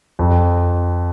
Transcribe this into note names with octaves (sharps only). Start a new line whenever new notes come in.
F2